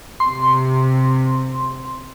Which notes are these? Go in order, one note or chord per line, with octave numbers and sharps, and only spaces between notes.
C3 C6